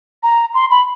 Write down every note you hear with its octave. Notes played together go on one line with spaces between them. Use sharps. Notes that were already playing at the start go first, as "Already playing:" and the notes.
A#5
C6
B5